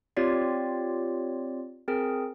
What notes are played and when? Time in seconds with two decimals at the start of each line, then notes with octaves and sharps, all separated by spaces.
0.17 C4 F4 G4 C#5 D5
1.88 C4 G#4 A#4